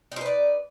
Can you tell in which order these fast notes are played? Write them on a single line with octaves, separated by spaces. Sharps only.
D#4 C5 B4 D5